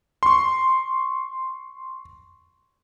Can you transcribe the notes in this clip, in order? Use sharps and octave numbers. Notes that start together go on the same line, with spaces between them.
C6 C#6